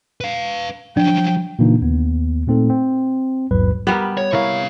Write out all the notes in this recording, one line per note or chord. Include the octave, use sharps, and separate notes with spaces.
B4 F5
F3 F#3 D4 G5
A#2 C#3 E3 A#3 D4 D#4
D#2 B3
A#2 A3 C4 D#4 A4
C4
A#1 E2 G#2 F#3 B4
G3 B3 G4 A#4
C#5
C3 E4 A#4 C#5 F5